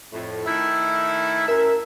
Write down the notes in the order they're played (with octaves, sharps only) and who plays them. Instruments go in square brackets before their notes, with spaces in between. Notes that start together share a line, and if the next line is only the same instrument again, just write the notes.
[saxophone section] F2 A2
D#3 A3 E4
[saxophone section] F#2 E5 [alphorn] A#4